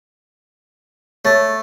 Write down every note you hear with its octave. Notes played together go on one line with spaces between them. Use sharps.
A3 C#5 A6